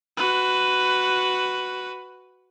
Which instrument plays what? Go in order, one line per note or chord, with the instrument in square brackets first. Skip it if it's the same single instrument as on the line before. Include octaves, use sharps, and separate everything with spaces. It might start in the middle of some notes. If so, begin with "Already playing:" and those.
[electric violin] F#4 B4